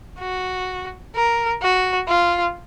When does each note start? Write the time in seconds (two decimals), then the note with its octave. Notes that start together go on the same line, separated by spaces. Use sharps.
0.20 F#4
1.15 A#4
1.62 F#4
2.08 F4